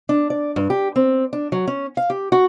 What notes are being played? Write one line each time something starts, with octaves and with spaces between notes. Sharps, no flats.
D4
D5
G2
G4
C4
D4
F#3
C#4
F5
G4
F#4